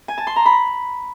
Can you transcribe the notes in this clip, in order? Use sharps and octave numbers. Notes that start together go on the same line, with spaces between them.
G#5
A5
C6
A#5
B5